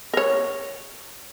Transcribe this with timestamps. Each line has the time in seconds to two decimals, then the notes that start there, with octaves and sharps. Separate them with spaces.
0.14 A#4 C#5